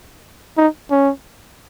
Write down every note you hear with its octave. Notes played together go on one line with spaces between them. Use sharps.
D#4
C#4